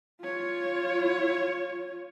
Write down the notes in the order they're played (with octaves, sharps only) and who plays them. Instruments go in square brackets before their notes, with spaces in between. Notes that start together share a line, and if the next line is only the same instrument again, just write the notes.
[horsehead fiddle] F4 C#5